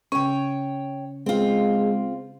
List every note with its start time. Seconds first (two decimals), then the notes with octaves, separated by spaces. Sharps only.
0.12 C#3 C#4 C#5 G5
1.26 G#3 C4 F4